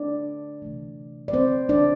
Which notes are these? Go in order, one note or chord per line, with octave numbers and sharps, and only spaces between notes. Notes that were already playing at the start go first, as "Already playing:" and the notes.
Already playing: D3 A3 D4 D5
C3 E3 A3
D5
C4 C5
D4 D5